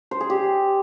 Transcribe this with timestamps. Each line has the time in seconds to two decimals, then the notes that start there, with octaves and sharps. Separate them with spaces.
0.11 C5
0.20 G#4
0.30 G4